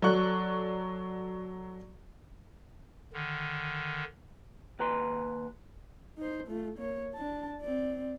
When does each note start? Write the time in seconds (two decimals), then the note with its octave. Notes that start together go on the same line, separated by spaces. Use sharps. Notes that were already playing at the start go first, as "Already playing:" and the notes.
0.02 F#3 A4 D5 C#6 F#6
3.13 D3 D#3
4.79 D#2 B4 A#5 C6
6.18 D#4 C5
6.48 A3 F4
6.78 A#3 C#5
7.14 D4 A5
7.61 C4 D5